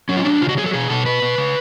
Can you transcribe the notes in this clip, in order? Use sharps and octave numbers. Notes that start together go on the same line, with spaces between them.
F#3 C#4
F4
F#3 D4
C#3 F4
F#4
F#3 G#4
A4
B2 G#4
B2 A4
B2 B4
B2
C#3